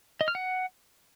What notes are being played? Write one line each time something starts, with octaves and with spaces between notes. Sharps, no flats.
D#5
F6
F#5